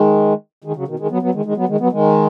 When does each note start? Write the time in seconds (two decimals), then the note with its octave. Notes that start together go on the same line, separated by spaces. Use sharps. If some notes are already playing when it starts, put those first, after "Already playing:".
Already playing: D#3 G#3
0.64 D#3 G#3
0.76 C#3 F#3
0.88 B2 D#3
0.99 D#3 G#3
1.11 F#3 B3
1.22 F#3 B3
1.34 D#3 G#3
1.45 D#3 G#3
1.57 F#3 B3
1.68 D#3 G#3
1.80 F#3 B3
1.92 D#3 G#3